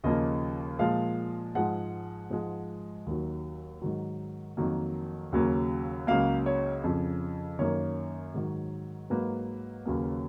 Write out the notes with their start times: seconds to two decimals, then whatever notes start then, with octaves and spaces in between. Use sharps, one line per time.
0.04 D#2 C#3 F3 A#3 D#5
0.79 A#2 F3 G#3 F5
1.55 G#2 F3 G#3 F#5
2.30 G#2 F3 G#3
3.06 D#2 D#3 F#3
3.82 G#2 D#3 F#3
4.57 F2 D#3 F#3 A#3
5.32 D#2 C#3 F#3 A#3
6.07 C#2 C#3 F#3 A#3 F5
6.46 C#5
6.84 F2 C#3 F3
7.59 F#2 D#3 A#3 C#5
8.34 G#2 D#3 F#3
9.10 G#2 F#3 A#3 B4
9.86 D#2 C#3 F#3 A#3